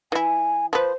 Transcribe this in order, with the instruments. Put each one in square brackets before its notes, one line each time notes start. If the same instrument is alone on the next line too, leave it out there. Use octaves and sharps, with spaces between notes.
[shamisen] E3 E4 [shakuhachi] G#5
[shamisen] F3 B4 [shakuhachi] C5